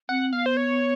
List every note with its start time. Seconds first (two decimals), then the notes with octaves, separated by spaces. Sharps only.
0.09 C4 F#5
0.32 B3 F5
0.46 C5
0.57 C#5